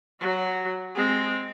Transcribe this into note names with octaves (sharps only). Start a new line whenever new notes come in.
F#3 F#4
G#3 C4